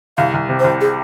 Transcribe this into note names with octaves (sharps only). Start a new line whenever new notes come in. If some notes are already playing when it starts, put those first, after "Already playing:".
C2 F5
C2
C3
C5
C2
G#4